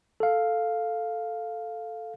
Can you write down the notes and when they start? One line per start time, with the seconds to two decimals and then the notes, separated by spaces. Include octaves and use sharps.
0.20 A4 F5